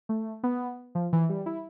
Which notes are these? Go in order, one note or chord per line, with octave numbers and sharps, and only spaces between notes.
A3
B3
F3
E3
G3
E4